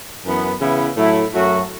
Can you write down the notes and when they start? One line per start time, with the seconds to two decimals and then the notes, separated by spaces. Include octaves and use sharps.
0.25 F#2 E3 B3
0.61 C#3 E3 B3 E4
0.97 A2 F#3 A3 E4
1.32 F#2 F#3 A3 F#4